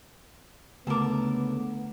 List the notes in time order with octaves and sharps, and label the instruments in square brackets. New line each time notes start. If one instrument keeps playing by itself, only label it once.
[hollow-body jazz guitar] C#2 A#4 [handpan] D3 A3 [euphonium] B3 [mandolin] A5 D6